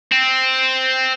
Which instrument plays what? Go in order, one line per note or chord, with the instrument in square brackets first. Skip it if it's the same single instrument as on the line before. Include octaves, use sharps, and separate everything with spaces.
[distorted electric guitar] C4